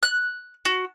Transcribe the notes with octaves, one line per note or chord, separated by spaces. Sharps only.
F#6
F#4